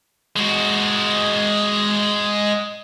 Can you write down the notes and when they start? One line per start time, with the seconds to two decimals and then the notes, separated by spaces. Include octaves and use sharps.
0.36 G#3 F#4